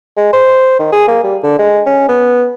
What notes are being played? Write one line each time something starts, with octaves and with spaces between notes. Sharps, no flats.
G#3
C5
D#3
G#4
A#3
G3
D3
G#3
C#4
B3